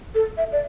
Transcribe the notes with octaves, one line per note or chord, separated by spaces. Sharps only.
A4
E5
D5